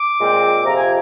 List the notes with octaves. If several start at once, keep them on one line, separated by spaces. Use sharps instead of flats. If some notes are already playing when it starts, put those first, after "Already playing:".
Already playing: D6
A#2 G#3 C4
F2 C3 F3 A#5
G#5